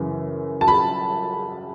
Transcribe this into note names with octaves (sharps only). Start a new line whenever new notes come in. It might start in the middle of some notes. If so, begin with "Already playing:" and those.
Already playing: F#2 C#3 E3
A5
B5